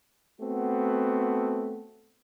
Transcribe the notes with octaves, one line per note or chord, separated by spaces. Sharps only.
A3 B3 C4 F#4